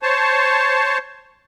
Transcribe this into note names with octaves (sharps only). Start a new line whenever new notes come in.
C5 C#5 A5